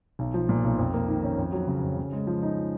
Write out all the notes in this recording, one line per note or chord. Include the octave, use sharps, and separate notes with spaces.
B1
F3
A#2
B1
F2
A#3
D#3
C#4
F2
F#3
C#3
F2
C#3
G#3
F3
D#4